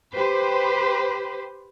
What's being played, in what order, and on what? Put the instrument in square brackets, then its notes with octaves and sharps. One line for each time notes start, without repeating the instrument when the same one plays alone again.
[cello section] G4 B4 C5